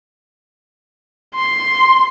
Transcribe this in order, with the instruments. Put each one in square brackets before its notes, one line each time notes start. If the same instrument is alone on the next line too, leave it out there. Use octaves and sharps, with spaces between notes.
[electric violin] C6